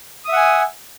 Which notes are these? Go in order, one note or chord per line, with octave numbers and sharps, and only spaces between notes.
E5 F#5 G#5 D#6